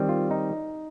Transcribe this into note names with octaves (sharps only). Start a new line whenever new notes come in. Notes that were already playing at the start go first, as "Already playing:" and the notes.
Already playing: D#3 G3 C4
F4
D#4